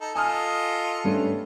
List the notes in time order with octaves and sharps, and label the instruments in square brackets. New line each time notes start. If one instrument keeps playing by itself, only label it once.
[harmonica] D#4 A4
[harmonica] F4 A4 D#5 [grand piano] G#5 D#6 F6
[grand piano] G2 A3 C#4